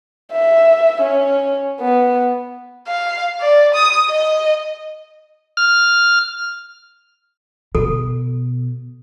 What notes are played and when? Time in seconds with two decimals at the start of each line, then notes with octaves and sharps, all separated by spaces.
0.32 E5
1.02 C#4
1.80 B3
2.87 F5
3.41 D5
3.74 D#6
4.09 D#5
5.57 F6
7.75 B2 A4